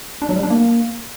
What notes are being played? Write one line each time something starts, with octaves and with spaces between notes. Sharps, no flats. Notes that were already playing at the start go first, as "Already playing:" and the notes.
D4
F#3
G3
D4
A#3